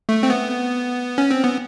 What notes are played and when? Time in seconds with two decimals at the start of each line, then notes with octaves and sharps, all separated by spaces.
0.09 A3
0.23 C4
0.30 B3
1.18 C#4
1.31 C4
1.44 B3